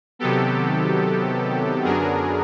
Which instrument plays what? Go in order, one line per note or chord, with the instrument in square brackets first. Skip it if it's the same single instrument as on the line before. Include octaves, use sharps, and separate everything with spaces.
[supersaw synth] C3 D#3 F#3 B3 G4 A4
F#2 D3 F#3 B3 D4 G#4 A#4